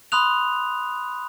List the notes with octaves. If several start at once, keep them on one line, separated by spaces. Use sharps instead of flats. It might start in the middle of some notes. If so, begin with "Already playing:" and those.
B5 C6 D#6 F#6 F7